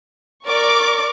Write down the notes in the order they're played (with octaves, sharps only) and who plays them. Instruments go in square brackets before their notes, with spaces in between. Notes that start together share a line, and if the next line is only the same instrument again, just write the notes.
[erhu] A#4 [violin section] D5 C#6 D6